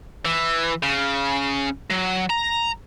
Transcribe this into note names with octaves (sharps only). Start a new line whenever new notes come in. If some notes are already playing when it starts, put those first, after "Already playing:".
E3
C#3
F#3
A#5